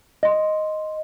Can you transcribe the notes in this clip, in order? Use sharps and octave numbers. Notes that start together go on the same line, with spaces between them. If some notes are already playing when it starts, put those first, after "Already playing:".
D#5 C6